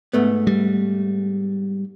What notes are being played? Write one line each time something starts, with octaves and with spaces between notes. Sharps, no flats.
G#2 A3 B3
G3